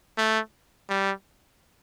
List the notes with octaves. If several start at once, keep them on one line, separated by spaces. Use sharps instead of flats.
A3
G3